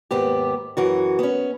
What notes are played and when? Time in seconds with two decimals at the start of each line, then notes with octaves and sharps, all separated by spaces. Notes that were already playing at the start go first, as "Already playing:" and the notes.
0.11 D#2 G#2 B3 G4
0.77 F#2 E3 F#4
1.19 B3 C#4